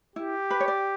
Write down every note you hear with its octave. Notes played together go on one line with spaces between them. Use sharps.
E4 G4
B4
C#5
D5